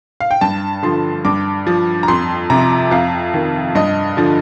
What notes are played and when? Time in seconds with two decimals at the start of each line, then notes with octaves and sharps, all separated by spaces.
0.20 F5
0.31 G5
0.41 G2 A5
0.83 D3 F3 C6
1.25 G2 D6
1.67 F3
2.03 A#5
2.08 F2 C6
2.50 C3 F3 A#5
2.91 F2 F5
3.34 D#3
3.75 G2 D#5
4.17 D3 F3